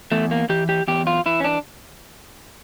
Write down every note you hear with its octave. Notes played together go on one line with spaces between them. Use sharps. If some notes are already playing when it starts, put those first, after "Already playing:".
E2 A3
A#3
E3 G4
G4
E2 G4
F4
E3 E4
C#4
D4